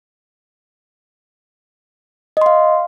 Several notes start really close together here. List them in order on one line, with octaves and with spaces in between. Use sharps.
D#5 C6 F5